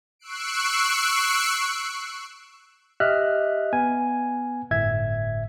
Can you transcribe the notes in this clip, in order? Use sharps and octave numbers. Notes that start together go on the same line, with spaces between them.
C#6 E6 F#6 C7 D7
G4 D#5 E5 F6 F#6
B3 G#5
G1 A2 E5 G#6